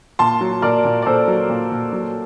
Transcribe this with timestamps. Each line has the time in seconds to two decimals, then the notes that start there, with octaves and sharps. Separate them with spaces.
0.19 A#2 A5 C6
0.41 F#3
0.62 A#2 A#4 D5
0.85 A#2
1.02 D5
1.06 A#2 A4 C5
1.28 F#3
1.49 A#2
1.71 A#2
1.92 F#3